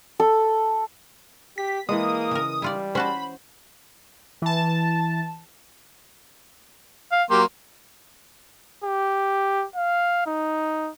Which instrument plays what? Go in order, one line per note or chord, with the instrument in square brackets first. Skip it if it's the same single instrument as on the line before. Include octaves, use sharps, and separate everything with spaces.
[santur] A4
[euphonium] G4 [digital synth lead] B6
[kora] E3 G#3 [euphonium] A#3 [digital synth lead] D#6
[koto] C#3 A#4
[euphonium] G3 [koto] E4 F4 D5
[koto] C#4 F#4 A5 [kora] C5 [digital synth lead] B5
[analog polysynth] E3 A5
[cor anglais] F5
[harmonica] F#3 A#3 C6 [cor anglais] G4
[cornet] G4
F5
D#4